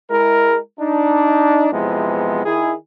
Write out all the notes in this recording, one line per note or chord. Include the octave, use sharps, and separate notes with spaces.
G#3 E4 A#4
D4 D#4
E2 C3 E3 F3 G#3 B3
D#3 E4 G#4